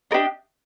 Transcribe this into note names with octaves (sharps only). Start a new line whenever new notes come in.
D4 G4 A#4 D#5